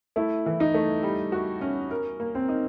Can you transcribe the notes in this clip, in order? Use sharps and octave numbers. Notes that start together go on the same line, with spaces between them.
A3 E4
E3
D#4
A3
G3
F#4
C#4
A#4
A#3
C4
D#4